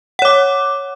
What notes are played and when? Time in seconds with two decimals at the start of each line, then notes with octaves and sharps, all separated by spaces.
0.19 F#5
0.22 C#5
0.25 D6